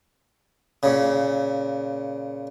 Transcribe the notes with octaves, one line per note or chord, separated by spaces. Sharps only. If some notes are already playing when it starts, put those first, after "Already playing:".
A#2 C#3